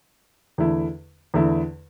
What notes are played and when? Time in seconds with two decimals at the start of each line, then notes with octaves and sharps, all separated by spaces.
0.58 E2 D3 A3 E4
1.34 E2 D3 A3 E4